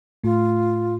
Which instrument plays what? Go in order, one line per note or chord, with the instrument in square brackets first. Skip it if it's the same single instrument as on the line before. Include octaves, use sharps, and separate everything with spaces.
[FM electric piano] A2 A3 [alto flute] F4